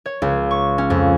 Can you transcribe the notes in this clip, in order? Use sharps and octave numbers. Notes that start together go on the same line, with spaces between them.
C#5
C#2
C#6
C#4
F2